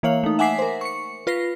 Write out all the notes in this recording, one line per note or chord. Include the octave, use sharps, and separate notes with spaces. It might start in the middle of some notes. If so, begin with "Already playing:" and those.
E3 A#3 C#5 F5 F#7
A3 D#4
E5 F#5 G#5 D6 B6 C7
A#4 C5
C#6 C#7
F4 B4 A#6 C7